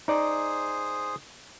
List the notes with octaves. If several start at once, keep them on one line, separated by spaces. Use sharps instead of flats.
D#4 G#4 C5 D5 D#6